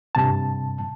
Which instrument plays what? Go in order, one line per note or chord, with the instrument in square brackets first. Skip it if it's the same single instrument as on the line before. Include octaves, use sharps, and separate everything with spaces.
[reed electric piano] G2 C3 A5